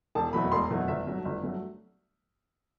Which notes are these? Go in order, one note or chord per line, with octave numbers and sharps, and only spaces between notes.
E1 A5
E2 B2 F#3 A3 B5
B5
E1 C6
E2 B2 F#3 A3
G1 E5
G2 F#3 A3
G1
G2 F#3 A3